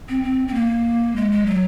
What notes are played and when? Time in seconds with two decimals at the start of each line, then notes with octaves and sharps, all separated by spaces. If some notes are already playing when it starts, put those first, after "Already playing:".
0.09 C4
0.23 C4
0.48 C4
0.54 A#3
1.16 G#3
1.32 G#3
1.46 F#3